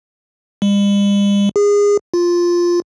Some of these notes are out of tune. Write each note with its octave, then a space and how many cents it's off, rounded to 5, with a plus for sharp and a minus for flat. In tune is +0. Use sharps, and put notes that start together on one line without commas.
G3 +45
G#4 -25
F4 +0